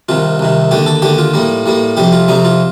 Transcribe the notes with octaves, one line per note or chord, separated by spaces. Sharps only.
C2 C3 D#3 F4
C2 C3 D#3
D#2 D3 A3 G4
A4
D#2 D3 A3 G4
F4
A2 G3 A#3
A2 G3 A#3
F2 C3 G3 G4
F4
F2 C3 G3 D#4
F4